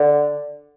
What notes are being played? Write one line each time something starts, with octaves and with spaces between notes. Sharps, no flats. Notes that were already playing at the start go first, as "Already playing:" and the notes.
Already playing: D3